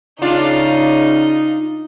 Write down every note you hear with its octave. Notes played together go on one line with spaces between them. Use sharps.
C#3 D4 D#4 F4